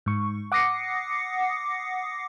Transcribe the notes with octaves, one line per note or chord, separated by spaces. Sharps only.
G#2 C#6
F#5 D6 D#6 A#6 C7 C#7